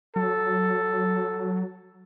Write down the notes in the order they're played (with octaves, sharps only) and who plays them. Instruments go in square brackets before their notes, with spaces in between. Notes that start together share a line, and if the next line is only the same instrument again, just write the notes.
[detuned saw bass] F#3 [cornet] A4